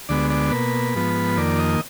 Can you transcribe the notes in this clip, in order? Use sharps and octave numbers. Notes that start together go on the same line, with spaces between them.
D2 D3 G#3 B3 D5
D5
B2 A#3 B4
G#2 F3 B3
F2 D#3 A#3 D5
D#5